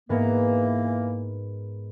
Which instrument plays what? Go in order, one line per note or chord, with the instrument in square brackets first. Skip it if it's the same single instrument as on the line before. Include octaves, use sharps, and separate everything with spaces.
[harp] G#2 B3 A#4 [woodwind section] E3 A#3